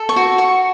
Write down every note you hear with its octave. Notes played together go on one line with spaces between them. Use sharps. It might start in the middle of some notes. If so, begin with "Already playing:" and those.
Already playing: A4
C#6
F#4
F#4 C#6